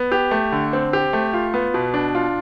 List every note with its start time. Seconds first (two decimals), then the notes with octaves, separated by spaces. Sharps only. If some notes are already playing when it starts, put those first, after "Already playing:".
Already playing: B3
0.12 G4
0.31 A3
0.52 D3
0.73 C4
0.93 G4
1.13 A3
1.34 F4
1.54 B3
1.74 B2
1.94 D4
2.15 F4